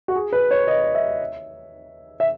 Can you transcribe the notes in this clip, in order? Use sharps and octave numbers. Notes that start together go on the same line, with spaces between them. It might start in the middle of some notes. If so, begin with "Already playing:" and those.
F#4
G#4
B4
C#5
D#5
E5
E5